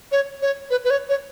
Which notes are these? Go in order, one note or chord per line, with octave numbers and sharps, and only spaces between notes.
C#5
C#5
B4
B4
C#5
C#5